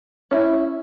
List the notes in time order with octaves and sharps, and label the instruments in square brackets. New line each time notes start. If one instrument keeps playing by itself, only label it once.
[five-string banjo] C#4 E4